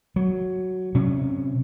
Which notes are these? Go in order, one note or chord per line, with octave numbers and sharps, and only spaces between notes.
F#3
C3 F#3 C#4